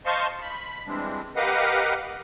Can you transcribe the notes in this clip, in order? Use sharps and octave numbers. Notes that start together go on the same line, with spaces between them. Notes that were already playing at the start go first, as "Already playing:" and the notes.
C5 D#5 F5 A5 C6 C#6
B5
E3 G3 G#3 C4 D4
G4 A#4 B4 D#5 F5 F#5